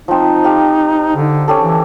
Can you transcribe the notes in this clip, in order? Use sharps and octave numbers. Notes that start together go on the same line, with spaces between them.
F3 C4 D#4
G4 F5
D3
C#4 G4 A4
E3